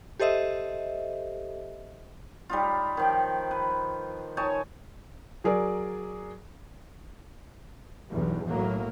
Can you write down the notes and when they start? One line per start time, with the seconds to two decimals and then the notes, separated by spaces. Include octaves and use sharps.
0.20 G4 A4 C5 D#5 E5
2.49 G3 D#4 F4
2.97 D#3 F3 G5
3.51 B4
4.37 D#4 C#5 G#5 A5
5.44 F#3 G#4 A#4 D5
8.10 B1 E2 G2
8.47 B1 A2 F#3 A#3